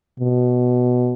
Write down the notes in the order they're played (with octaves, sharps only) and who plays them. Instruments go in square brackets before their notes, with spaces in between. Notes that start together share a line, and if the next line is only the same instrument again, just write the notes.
[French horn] B2